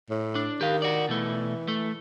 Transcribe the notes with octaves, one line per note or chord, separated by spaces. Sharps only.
A2
D4
D#3 G4 F5
F#4 D5
B2 E3 A3
A3